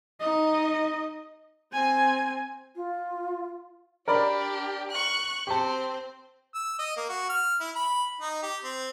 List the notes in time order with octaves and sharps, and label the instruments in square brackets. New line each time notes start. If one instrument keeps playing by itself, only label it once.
[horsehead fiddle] D#4 D#5
C4 G#5
[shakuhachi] F4
[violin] D4 G4 [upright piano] A#4 D5 B5
[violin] C#6 F#6
[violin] C4 C5 [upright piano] G4 A5
[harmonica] E6
D#5
A#3
F#4
F6
E4
B5
D#4
G4
C4